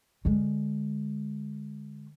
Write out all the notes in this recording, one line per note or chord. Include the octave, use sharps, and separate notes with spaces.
D3 G#3